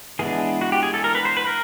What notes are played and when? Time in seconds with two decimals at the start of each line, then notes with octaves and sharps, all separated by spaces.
0.19 E3 G#3 B3 D4 G#4
0.61 F#4
0.72 G4
0.83 G#4
0.94 A4
1.04 A#4
1.15 B4
1.25 C5
1.37 B4
1.47 A#4